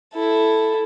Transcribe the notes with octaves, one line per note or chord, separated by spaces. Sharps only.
E4 A4